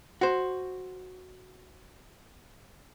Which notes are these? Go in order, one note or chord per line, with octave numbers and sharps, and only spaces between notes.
F#4 C5